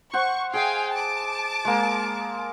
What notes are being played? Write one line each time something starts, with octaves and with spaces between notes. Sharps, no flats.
C5 F#5 C#6
G#4 D#5 F5 G5 G#5
A5 D6
G#3 A#3